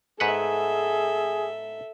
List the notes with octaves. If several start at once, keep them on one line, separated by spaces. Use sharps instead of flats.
G#2 G#4 A4 B4 E5 F#5